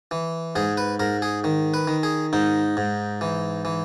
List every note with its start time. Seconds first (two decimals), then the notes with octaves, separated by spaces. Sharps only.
0.11 E3
0.56 G#2 G#4
0.77 B4
1.00 G#2 A#4
1.22 G#4
1.44 D#3
1.74 B4
1.88 D#3
2.03 G#4
2.33 G#2 D#4
2.77 G#2
3.21 E3
3.65 E3